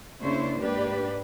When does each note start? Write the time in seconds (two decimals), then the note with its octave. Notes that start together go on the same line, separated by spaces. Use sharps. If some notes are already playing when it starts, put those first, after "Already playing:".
0.21 C#3 A#3 D4 E4 C5 C#5
0.60 G#2 A#3 D4 G4 B4 D5